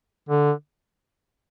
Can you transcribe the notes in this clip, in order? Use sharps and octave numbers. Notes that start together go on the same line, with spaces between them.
D3